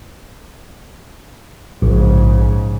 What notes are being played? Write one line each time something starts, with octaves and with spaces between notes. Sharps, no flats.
A#1 G#2 C#3